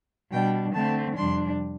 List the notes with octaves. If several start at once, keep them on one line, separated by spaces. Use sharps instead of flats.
B2 G3 D4 G5
D3 A3 C4 A5
F2 C3 G3 D4 C6